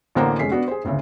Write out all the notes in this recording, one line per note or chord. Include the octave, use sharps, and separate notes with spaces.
A1 D3 A#3 C5 F#5 A#5
F1 G#3 C#4 B6 C7
B3 D4 F#4
G#4 C5
G#1 D2 C#3 E5